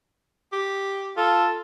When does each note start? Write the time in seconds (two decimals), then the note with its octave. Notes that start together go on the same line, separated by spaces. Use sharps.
0.53 G4
1.17 F4 A4